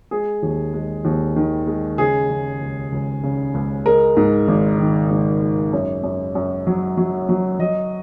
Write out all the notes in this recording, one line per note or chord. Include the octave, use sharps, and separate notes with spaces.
G#3 G#4
D#2
G#3
D#2
D#3
G#3
C#3 G#4
C#3
C#2
C#2
C#3
C#2
G#3 A#4
G#2
G#1
D#3
G#2
G#3
F#2
F#2
F#2
F#3
F#3
F#3
F#3 D#5